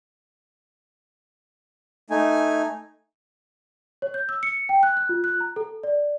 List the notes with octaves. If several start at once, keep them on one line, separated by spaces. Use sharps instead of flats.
A3 D#4 G#5
C#5
G6
E6
C#7
G5
F#6
F#6
F4
F#6
A#5
A4
D5